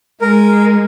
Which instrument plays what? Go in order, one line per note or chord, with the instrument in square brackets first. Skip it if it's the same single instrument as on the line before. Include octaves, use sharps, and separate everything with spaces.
[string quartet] G#3 [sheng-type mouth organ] A#4